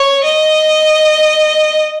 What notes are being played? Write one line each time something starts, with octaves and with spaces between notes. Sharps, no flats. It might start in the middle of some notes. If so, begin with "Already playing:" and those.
Already playing: C#5
D#5